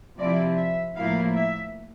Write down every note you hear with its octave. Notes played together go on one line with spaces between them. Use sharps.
C3 F3 C4 E4 D5
E5
A2 F3 A#3 E4 F5
E5